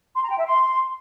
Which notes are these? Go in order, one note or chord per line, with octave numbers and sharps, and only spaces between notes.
C6
A#5
G5
E5
C6